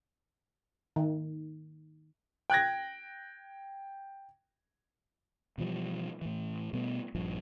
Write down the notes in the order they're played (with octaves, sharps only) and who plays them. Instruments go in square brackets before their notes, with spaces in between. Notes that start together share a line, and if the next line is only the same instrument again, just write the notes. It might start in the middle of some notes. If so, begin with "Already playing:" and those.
[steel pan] D#3
[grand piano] G5 F#6 G#6 A#6
[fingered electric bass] B2 E3 F3 G3
A2 E3
B2 G3 A3 B3
A#1 G2 F3